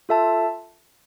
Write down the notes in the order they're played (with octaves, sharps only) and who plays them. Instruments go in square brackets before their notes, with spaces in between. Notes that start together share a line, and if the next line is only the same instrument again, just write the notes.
[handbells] F4 A4 E5 A5